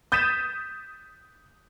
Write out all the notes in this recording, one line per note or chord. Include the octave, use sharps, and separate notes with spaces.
D#6 G6 A6 B6 D#7 E7